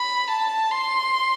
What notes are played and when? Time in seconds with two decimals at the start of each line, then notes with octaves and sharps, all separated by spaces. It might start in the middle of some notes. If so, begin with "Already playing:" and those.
Already playing: B5
0.27 A5
0.71 C6